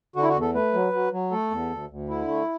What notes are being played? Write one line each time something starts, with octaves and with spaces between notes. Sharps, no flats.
D3 F#4
E4
F#4
E2
A4
A3 B4
F#3
F#3
F#3
A3 A4
E2
D2
D2
D3 E4
A3